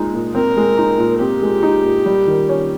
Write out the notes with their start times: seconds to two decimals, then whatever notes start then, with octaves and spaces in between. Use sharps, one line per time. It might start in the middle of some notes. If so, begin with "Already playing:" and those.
Already playing: A#2 G#3 D#4
0.14 A#2
0.35 C4 A#4
0.57 G#3
0.78 D#4
0.98 A#2
1.20 C4 G4
1.42 G#3
1.63 D#4
1.84 A#2
2.06 G3
2.27 D#3
2.49 C#4